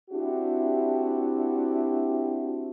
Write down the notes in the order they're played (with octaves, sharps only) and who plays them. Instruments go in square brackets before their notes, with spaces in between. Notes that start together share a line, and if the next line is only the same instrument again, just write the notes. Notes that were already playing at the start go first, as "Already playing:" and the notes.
[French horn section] C4 D4 E4 F#4 G4